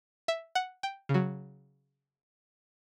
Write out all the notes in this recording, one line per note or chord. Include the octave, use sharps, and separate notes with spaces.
E5
F#5
G5
C#3 F#3